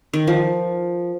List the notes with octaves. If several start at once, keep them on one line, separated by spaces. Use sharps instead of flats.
D#3
F3